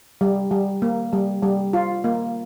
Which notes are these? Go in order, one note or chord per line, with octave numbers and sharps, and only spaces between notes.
G3
G3
A#3
G3
G3
F4
A#3